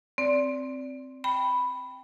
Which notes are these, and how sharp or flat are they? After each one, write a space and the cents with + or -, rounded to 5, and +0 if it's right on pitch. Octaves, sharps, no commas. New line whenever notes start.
C4 +0 D5 -20
G5 +0 B5 +0